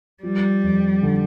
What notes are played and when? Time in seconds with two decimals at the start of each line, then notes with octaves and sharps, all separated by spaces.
0.23 F3 G3
0.63 F2
1.03 D3